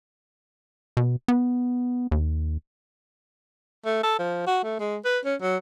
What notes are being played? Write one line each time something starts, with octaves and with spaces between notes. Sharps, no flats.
B2
B3
D#2
A3
A4
F3
F#4
A3
G#3
B4
C#4
F#3